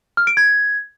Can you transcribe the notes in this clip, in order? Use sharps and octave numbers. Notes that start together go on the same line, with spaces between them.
F6
D7
G#6